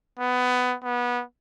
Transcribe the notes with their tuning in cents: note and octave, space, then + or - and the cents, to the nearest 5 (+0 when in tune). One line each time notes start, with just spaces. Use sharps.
B3 +15
B3 -20